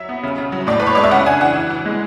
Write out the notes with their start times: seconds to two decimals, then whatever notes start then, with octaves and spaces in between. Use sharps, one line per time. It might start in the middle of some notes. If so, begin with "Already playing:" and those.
Already playing: F#3 E5
0.09 B3
0.23 C#3
0.38 C#3
0.52 F#3
0.67 A2 D5
0.80 A2 B4
0.87 C#5
0.95 G#3 D5
1.04 E5
1.11 C#3 F#5
1.26 D4 G#5
1.41 E3 F#5
1.55 E3
1.70 E3
1.86 G#3